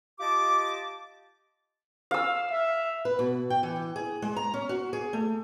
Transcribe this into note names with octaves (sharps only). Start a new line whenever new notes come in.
F4 G4 D#5 A5 D6
F5 E6
E5
B4
B2
G5
E3
G#4
G#3
A#5
C#4
F#4
G#4
A3